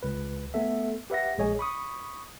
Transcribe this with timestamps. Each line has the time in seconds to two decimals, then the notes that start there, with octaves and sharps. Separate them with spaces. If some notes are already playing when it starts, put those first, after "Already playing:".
0.03 C#2 B4
0.54 A3 B3 A4 E5
1.10 G4 B4 E5 F#5 A#6
1.38 A#1 G#3 G#4 C#5 D#5 G#5
1.59 B5 C#6 D#6